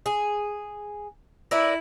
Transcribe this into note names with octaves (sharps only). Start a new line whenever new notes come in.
G#4
E4 A#4 B4 D5